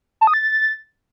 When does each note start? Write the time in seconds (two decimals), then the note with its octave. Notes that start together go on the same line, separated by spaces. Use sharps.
0.21 A5
0.27 D#6
0.34 A6